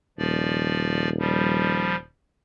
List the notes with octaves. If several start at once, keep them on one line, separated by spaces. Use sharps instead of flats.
D#1 F3 D5
F3 G3